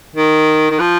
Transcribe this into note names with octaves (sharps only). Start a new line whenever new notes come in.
D#3
D#3
F3